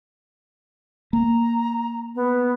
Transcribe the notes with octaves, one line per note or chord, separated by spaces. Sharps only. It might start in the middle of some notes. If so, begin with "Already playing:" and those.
A#3 A#5
B3